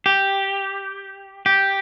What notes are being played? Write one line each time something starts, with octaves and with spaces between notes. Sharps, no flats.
G4
G4